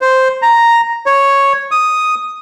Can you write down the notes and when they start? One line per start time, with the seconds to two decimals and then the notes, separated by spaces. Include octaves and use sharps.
0.01 C5
0.42 A#5
1.06 C#5
1.71 D#6